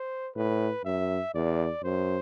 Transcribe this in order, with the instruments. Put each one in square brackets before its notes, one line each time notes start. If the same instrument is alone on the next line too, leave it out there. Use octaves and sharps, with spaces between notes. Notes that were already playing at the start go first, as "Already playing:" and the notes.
Already playing: [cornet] C5
[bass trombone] A2 [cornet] B4
[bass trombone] F#2 [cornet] E5
[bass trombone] E2 [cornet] D5
[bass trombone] F#2 [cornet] C5